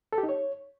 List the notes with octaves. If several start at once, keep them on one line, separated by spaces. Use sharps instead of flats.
A4
G4
D#4
C#5